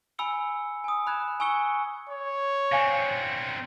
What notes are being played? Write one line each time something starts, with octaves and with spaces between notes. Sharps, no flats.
G#5 B5 E6 C#7 G7
G#5 D#6
B5 F#6 G#6 E7
G#5 C#6 E6 C#7 G7
C#5
D3 C4 F5 G#5 C6